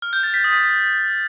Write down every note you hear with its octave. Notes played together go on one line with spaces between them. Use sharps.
F6
G6
A6
B6
D#6